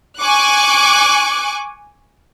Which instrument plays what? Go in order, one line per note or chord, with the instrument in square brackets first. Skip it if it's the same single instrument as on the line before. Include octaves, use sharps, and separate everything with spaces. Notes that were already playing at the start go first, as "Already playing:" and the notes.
[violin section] G#5 C#6 D6 F#6